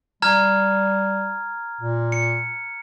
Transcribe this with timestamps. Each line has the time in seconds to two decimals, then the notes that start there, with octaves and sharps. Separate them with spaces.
0.22 G3 A#5 F6 G#6
1.81 A#2
2.12 C#7